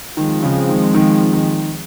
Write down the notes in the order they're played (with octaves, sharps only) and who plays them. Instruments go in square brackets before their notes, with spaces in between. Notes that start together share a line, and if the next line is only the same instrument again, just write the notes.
[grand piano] D#3 [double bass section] F3 G#3 C4
[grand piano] C#3
D#3
D#3
D#3